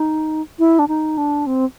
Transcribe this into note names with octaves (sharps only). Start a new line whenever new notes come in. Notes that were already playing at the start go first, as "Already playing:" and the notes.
Already playing: D#4
E4
D4
D#4
D4
C4